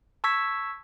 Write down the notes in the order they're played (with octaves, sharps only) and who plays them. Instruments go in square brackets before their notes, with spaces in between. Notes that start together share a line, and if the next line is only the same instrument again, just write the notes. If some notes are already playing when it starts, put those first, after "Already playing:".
[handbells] A5 C#6 E6 G#6 B6